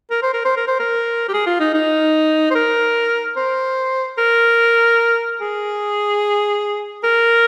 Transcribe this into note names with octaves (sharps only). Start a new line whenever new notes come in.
A#4
C5
A#4
C5
A#4
C5
A#4
G4
G#4
F4
D#4
D#4
C5
A#4
C5
A#4
G#4
A#4